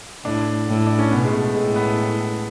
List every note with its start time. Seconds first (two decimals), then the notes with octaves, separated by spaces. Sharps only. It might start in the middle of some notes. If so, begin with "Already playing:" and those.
0.25 A2 D4
0.68 A2
0.87 D4
0.99 C#4
1.11 B2 B3
1.25 G#3
1.33 A3
1.54 A2 G#3
1.76 B3